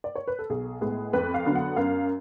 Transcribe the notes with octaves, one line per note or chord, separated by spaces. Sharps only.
D5
C#5
B4
A4
B1 G#4
A2 G#3 B3 G#4
F2 B4
F5
D3 F#3 B3
F#5
F#2 F5